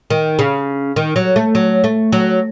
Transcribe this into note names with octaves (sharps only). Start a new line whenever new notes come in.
D#3
C#3
D#3
F#3
A3
F#3
A3
F#3